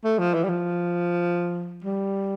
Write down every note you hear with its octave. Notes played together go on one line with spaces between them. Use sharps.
A3
F3
E3
G3
F3
G3